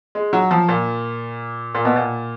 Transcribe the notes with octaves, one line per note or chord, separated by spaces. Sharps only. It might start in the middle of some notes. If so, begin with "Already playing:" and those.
G#3
F#3
F3
A#2
A#2
B2
A#2